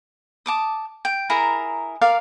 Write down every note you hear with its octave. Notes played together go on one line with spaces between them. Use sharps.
A5 D6 D#6
G5
E4 G#4 A#4 A#5
A#4 D5 F5